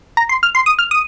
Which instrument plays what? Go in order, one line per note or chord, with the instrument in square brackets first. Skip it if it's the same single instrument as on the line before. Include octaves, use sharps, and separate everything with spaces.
[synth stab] A#5
C6
F6
C6
D#6
F6
D#6